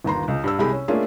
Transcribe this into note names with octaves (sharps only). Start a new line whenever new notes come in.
G1 D#2 A#5 C6
C#2
G2 E6
C2 C3 G#3 G4 G#4 B5
C#4
A3 A#3 C#4 D4 F4 G#4